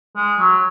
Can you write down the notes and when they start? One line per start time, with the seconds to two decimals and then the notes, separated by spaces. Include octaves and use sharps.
0.16 G#3
0.39 F#3